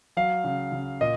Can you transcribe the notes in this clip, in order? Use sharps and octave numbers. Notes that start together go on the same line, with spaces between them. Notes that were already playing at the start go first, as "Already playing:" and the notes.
F#3 F5
C#3
C#3
A#2 D#5